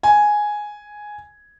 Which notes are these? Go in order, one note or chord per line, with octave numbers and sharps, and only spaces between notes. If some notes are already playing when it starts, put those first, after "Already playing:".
G#5